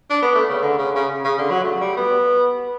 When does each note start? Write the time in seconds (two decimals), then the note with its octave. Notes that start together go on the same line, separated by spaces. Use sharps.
0.10 D4
0.22 B3
0.35 A3
0.49 C#3
0.62 D3
0.78 C#3
0.95 C#3
1.24 C#3
1.38 D3
1.50 F#3
1.63 A3
1.80 G3
1.97 B3